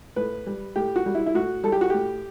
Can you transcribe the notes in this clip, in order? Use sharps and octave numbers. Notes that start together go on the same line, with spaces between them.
A2 B4
G3
A2 G4
F#4
G3
E4
E4
A2 F#4
G3 A4
G4
F#4
A2 G4